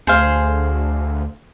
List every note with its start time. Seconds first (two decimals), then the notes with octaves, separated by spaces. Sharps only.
0.07 D2 G#4 C5 F5